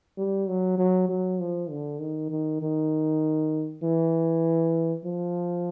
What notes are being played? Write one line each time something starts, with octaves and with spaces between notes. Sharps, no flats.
G3
F#3
F#3
F#3
F3
D3
D#3
D#3
D#3
E3
F3